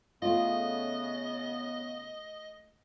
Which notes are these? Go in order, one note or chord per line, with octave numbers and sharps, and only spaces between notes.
C#3 A3 B3 F4 D#5